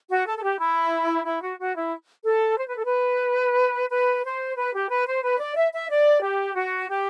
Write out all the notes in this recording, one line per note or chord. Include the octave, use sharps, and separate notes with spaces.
F#4
A4
A4
G4
E4
E4
F#4
F#4
E4
A4
C5
B4
A4
B4
B4
C5
B4
G4
B4
C5
B4
D5
E5
E5
D5
G4
F#4
G4